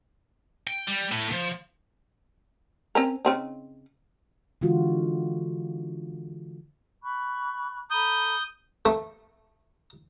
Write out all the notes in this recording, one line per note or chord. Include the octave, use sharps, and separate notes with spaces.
G5
G3
A2
F3
C4 C#4 A#4
C#3 C4 D#4
D3 E3 G#3 F4 F#4
B5 C#6 F#6
A4 A#5 B5 D#6 G6
A3